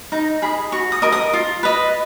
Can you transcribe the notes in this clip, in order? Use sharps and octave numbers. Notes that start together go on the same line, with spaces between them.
D#4 A#5
G#4 D#5 B5
F#4 C#6
D#6
A#4 D#5
D#6
F4
B4 D#5